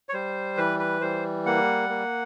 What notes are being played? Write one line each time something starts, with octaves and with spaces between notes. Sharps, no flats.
C#5
G3 C5
E3 B4
B4
G3 C5
A#3 F#5
A#3